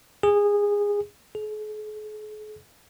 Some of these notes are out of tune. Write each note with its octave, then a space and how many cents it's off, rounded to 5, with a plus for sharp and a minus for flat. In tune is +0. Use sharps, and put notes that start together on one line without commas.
G#4 -20
G#4 +45